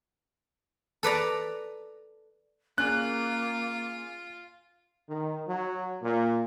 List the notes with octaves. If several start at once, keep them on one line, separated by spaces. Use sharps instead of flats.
A4 B4 D5 A#5
A#3 C#4 F4 G#4 D5 F#6
D#3
F#3
A#2